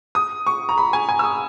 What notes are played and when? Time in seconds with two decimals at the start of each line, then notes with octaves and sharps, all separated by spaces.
0.15 D#6
0.47 C#6
0.69 A#5
0.78 B5
0.93 G#5
1.09 G#5
1.19 E6
1.24 D#6